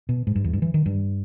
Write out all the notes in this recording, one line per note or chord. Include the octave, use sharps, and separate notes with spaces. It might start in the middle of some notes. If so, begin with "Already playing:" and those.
B2
G#2
G2
E2
G2
E3
D#3
G2